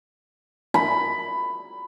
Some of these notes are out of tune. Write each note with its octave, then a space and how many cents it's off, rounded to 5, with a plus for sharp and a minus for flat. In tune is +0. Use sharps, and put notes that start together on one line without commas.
B5 +10